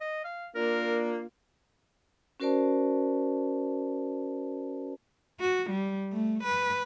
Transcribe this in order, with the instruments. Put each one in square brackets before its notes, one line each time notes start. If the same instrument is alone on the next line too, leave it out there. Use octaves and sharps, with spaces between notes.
[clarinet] D#5
F5
[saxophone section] A#3 D4 F4 [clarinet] A#4
[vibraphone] C#4 F#4 A#4 C5 D5 A5
[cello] F#4
G3
A3
B4